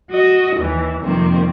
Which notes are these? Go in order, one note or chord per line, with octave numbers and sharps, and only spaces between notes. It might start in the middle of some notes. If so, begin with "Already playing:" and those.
F#4 D#5
D#2 E3
F2 C3 D#3 G3 A#3 C4